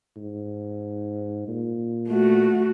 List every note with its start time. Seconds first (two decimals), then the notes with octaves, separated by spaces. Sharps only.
0.16 G#2
1.48 A#2
2.09 A3 F#4